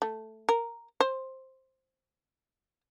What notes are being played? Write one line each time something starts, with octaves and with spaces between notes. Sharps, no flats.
A3
A#4
C5